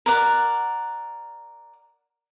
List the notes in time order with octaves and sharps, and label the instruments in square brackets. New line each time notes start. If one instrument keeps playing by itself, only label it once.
[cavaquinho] A#4 D5 F#5